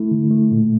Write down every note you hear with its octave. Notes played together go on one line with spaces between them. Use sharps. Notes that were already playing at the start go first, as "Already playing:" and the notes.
Already playing: A3 E4
D3
A3
A#2